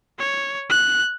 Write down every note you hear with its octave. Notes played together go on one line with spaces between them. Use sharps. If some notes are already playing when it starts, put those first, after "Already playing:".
C#5
F#6